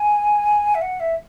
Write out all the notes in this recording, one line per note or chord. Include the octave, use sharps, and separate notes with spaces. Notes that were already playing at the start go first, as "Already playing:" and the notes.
Already playing: G#5
E5
F#5
E5